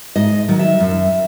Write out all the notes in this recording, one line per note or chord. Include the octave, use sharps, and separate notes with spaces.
G#2 D#5
D#3 F#3
E5
F#2